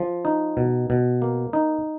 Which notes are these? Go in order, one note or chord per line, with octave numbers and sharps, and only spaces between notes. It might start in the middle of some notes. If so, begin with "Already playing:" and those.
Already playing: F3
D#4
B2
B2
A#3
D#4